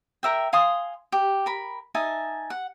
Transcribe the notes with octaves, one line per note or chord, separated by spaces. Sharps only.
A#4 E5 G5
F5 G#5 C6 D#6
G4
A#4 B5
D#4 E5 G#5 A5
F#5